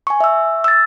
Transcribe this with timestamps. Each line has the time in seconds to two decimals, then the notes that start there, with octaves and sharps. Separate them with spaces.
0.07 G#5 C#6
0.20 E5 E6
0.64 E6 A6